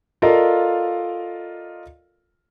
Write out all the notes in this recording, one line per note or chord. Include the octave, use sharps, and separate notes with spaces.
F4 A4 A#4 D5 D#5 F5